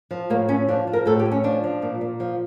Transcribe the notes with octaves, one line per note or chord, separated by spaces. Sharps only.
F3
A2 A#3
A2 C#4
F3 D4
F3
A#4
A2 A4
G4
A2
C#4
F3 D4
F3
A#2
A#2
F3